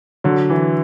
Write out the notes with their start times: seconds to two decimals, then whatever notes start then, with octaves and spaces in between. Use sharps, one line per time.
0.24 D3 F#3
0.50 E3